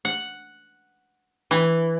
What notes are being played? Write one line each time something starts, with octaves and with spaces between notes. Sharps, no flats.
F#5
E3